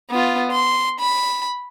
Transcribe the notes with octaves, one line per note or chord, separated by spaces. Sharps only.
B3 F4
C6
B5